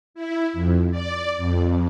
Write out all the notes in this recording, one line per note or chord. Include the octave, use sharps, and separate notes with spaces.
E4
F2
D5
F2